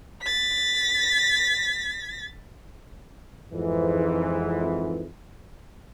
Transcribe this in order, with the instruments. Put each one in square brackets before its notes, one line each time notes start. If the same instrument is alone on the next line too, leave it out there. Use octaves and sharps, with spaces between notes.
[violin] A6 B6
[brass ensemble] F2 G#2 E3